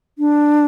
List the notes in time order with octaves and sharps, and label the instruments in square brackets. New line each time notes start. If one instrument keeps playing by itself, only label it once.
[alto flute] D4